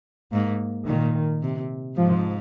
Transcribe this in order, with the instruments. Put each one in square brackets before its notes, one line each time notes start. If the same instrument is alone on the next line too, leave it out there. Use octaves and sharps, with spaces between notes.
[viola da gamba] G#2 [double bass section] A#3
[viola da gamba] A#2 [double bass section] D#3
[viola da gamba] C3
[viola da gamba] G#2 [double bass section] F3